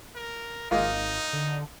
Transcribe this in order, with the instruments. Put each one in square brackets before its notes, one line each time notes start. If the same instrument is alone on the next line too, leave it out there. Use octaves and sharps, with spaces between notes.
[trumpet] A#4
[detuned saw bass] G#1 [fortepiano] G#3 A#3 F4 [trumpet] D#4
[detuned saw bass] D3